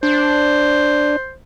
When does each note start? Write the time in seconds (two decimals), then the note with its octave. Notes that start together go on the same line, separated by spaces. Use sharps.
0.03 D4 C5